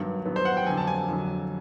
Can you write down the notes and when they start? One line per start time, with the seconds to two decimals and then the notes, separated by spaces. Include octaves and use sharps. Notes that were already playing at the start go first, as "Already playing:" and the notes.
Already playing: G2 D#3 F#3 B3
0.26 G2 D#3 F#3 B3
0.36 C5
0.45 F#5
0.57 G5
0.66 F2 D3 F#3 G#5
0.77 A5
0.87 G#5
1.08 F2 D3 F#3